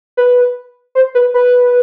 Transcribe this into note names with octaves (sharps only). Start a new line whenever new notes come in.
B4
C5
B4
B4